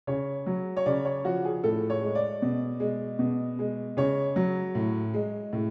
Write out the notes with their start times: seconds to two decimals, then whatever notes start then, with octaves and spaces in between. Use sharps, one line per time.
0.07 C#3 C#5
0.46 F#3
0.77 C#5
0.86 C#3 D5
1.05 C#5
1.25 F3 F#4
1.45 G#4
1.64 A2 A4
1.90 C#5
2.02 G#3
2.15 D5
2.42 B2
2.80 G#3
3.19 B2
3.59 G#3
3.97 C#3 C#5
4.36 F#3
4.75 A2
5.14 G#3
5.53 A2